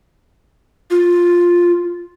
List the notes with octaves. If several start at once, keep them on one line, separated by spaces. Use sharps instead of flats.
F4